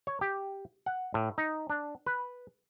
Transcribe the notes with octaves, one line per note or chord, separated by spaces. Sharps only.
C#5
G4
F#5
A2
D#4
D4
B4